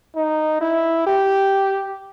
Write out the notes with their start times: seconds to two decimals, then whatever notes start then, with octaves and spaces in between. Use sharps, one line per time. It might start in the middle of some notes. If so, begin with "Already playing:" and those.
0.16 D#4
0.61 E4
1.07 G4